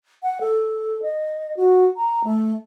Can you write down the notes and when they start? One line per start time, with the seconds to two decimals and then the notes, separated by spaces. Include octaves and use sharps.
0.23 F#5
0.41 A4
1.02 D#5
1.57 F#4
1.96 A#5
2.24 A3